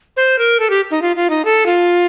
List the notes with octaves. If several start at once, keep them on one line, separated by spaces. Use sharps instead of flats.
C5
A#4
A4
G4
D#4
F4
F4
D#4
A4
F4